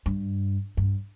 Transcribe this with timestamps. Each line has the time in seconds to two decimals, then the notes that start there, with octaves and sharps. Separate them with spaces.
0.06 G2
0.77 G2